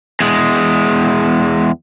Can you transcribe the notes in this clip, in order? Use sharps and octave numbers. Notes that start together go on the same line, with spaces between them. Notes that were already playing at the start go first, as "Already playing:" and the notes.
E2 G#3